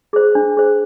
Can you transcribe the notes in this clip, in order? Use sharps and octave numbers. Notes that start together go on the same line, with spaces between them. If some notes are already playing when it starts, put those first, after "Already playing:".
G#4 C5
D4
G#4 C5